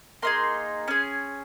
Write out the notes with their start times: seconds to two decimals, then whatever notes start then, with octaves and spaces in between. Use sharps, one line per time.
0.22 A#3 D#4 G#4 C6
0.88 C#4 G#4